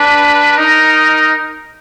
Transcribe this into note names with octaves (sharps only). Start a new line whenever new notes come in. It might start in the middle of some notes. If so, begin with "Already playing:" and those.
Already playing: D4 B4
D#4 A#4